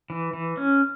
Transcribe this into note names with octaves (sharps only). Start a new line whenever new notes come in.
E3
E3
C#4